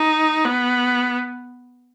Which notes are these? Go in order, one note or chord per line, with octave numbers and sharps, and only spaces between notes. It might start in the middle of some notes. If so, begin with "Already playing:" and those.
Already playing: D#4
B3